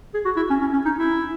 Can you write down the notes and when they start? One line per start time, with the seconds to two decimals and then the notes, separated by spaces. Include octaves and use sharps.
0.14 G#4
0.25 F#4
0.36 E4
0.49 C#4
0.61 C#4
0.73 C#4
0.85 D#4
0.96 E4